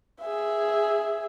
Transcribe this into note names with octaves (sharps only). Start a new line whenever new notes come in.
G#4 E5